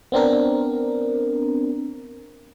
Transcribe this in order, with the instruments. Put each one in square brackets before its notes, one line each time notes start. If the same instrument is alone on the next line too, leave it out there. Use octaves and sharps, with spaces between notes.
[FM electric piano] B3 C4 D4 A#4